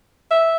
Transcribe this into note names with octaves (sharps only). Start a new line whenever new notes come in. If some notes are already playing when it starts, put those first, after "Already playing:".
E5